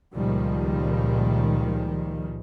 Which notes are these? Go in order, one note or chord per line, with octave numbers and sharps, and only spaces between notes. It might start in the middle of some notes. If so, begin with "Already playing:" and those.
C#2 A#2 D#3 F3 G3